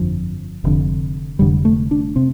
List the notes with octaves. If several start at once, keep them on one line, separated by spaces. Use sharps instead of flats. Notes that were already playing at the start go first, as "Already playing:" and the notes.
Already playing: G1 F2 D3 F3
F1 F2 D3
F1 F2 D3 G3
A3
D4
C3 C4